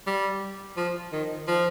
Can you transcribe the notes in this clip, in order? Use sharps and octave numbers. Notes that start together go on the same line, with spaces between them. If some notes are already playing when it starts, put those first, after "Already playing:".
G3
F3
D#3
F3